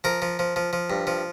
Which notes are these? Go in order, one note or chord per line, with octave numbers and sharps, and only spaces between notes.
F3 A#4
F3
F3
F3
F3
G2
F3